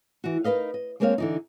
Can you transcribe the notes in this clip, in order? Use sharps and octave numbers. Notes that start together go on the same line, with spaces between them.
E3 F#4
D#4 A#4 B4 D#5 F5
D#5
G#3 A#3 C4 A#4 C#5 F5
D3 E3 D#4